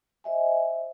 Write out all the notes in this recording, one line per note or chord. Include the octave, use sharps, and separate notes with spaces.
C5 D#5 E5 G#5